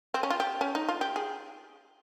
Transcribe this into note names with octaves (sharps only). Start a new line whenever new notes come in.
C4
C#4
F4
G4
C#4
D#4
F4
G4
G#4